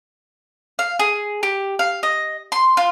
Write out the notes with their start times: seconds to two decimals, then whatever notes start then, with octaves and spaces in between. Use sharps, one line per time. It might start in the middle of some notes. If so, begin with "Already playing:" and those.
0.79 F5
1.00 G#4
1.43 G4
1.79 F5
2.03 D#5
2.52 C6
2.77 F4